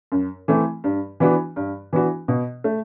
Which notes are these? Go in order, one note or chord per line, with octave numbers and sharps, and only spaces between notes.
F#2
E3 A3 C4
G2
E3 B3 D4 F#4
G2
E3 B3 D4 F#4
B2
A3